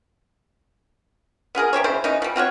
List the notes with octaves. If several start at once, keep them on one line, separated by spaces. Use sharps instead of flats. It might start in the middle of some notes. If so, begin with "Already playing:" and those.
B3 F4 G#4 A#4
C3 G4 C5 C#5
C#3 E4 C5
E3 C#4 D#4
F3 G3
C4 F4 F#4 C#5